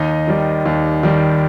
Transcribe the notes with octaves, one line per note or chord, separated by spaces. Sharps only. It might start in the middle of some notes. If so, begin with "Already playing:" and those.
Already playing: D#2 D#4 D#5
D#3 G3
D#2
D#3 G3